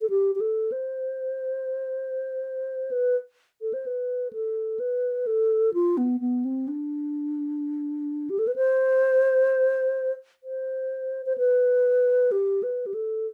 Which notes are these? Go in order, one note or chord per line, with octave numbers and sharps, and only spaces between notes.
A4
G4
G4
A4
C5
B4
A4
C5
B4
A4
B4
A4
F4
B3
B3
C4
D4
G4
A4
B4
C5
C5
C5
B4
G4
B4
G4
A4